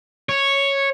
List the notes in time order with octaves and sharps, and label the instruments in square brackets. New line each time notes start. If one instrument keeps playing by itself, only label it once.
[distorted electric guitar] C#5